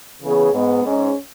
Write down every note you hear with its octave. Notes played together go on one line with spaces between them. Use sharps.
C#3 E3 B3 G#4 C#5
G#2 G#3 B3
G#2 G#3 C#4